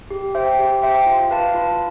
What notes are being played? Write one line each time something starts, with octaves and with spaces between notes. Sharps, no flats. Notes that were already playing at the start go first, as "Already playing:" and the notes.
G4
C5 E5 G5
G4
C5 E5 G5
F4
B4 F5 A5
F4